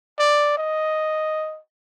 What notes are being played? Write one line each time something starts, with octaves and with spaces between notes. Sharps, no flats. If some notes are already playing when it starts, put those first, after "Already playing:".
D5
D#5